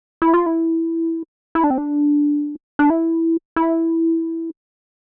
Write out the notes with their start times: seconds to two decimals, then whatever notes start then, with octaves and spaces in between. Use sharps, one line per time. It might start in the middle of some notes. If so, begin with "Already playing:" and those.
0.22 E4
0.34 F4
0.46 E4
1.55 E4
1.64 D4
1.70 C4
1.78 D4
2.79 D4
2.90 E4
3.56 E4